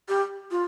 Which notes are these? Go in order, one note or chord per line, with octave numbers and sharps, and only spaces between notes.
G4
F4